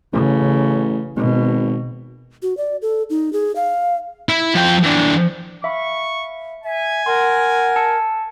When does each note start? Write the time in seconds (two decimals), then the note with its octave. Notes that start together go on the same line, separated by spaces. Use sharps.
0.13 A1 C#3
1.17 G#1 B2
2.42 F#4
2.57 D5
2.82 A4
3.10 D#4
3.33 G#4
3.56 F5
4.29 E4
4.54 F3 G5
4.83 E3 D4
5.64 E5 F5 B5 C#6
6.64 E5 G#5
7.06 A#4 F#5 C6
7.76 A5 E6 C#7